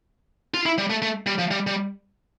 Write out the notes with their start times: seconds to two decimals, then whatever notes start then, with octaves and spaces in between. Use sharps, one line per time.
0.54 F4
0.66 E4
0.78 G3
0.90 A3
1.02 A3
1.27 G3
1.39 F3
1.51 G3
1.67 G3